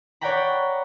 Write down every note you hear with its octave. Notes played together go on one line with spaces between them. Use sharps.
C#5 D5 F#5 G5 A#5 B5